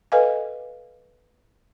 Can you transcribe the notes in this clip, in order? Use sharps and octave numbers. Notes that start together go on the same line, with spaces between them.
A4 B4 D#5 F5 G#5